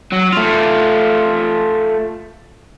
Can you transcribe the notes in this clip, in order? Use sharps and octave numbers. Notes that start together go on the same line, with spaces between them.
F#3
A3 F4